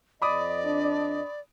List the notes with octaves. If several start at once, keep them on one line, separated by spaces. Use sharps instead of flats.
F2 D5 D#5 B5 D6 D#6
D4